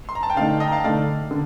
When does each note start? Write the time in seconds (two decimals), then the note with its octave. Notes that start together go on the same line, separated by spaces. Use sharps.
0.09 C6
0.15 A#5
0.23 A5
0.30 G5
0.37 D3 A3 D#4 D5 F5
0.60 D#5 G5
0.68 A#5
0.72 F5 A5
0.84 D3 A3 D#4 D5 F5
1.31 D3